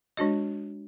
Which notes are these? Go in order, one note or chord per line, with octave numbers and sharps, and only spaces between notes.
G#3 D4 F#4 D#5